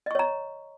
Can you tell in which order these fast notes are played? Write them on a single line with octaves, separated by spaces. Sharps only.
D#5 C#6 C#5 A#5